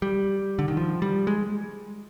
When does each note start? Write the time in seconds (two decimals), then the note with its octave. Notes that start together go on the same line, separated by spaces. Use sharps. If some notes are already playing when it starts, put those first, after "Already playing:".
0.02 G3
0.59 D3
0.68 D#3
0.77 F3
1.02 G3
1.27 G#3